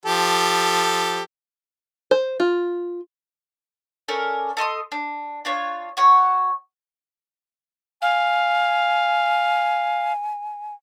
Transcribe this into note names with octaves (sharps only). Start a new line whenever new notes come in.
F3 G4 A4
C5
F4
C#4 A4 A#4 D5
A4 D#5 C6 D#6
D4
D4 F4 C#5
F#4 C#5 F#5
F5 G#5